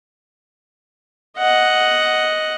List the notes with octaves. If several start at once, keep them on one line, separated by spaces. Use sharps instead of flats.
D#5 F#5